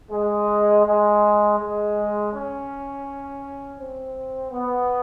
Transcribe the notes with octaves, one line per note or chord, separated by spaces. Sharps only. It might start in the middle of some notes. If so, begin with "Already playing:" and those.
G#3
G#3
G#3
C#4
C4
B3